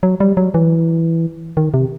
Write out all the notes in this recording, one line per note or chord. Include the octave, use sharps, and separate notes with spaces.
F#3
G3
F#3
E3
D#3
C3